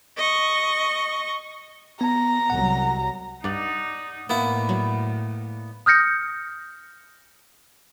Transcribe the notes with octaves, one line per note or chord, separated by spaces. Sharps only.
D#5 C#6
B3 A#5
C2 F#3 F#5
G2 D#4 D5 F#5
A2 A#3 B3 E4
F#3
D#6 F6 G6 A#6 C#7